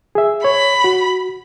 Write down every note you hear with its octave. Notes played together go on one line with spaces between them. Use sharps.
G#4 E5
C#5 B5
F#4